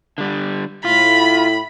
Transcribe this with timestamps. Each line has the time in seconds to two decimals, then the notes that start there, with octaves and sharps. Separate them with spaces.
0.18 D3 G3
0.85 A2 E4 F4 B5